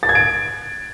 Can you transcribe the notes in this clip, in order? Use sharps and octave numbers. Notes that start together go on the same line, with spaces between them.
A6
G#6
D7